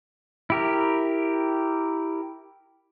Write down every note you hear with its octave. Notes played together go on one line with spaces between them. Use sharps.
E4 G4 A#4